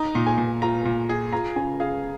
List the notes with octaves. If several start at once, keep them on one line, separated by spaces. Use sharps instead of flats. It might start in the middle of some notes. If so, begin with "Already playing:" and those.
Already playing: D#4 A#5
A#2
G#5
A#2
F4 A#5
A#2
G#4
F4 A#5
C#3 G#5
G#4 F5